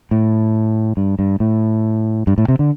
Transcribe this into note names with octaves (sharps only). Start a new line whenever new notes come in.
A2
G2
G2
A2
G2
A2
C3
D3